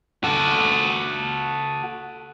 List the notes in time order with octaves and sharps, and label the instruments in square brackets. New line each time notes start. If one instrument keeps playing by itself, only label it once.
[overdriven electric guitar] F#4 A4